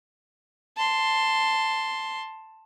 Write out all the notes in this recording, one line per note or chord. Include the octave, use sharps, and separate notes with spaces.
A5 C6